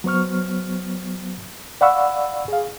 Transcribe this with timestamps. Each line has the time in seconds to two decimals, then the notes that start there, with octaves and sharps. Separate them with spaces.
0.04 F#3 B3 C5 C#6 F6
1.81 D5 F5 F#5 B5 C#6 E6
2.48 G#4 F5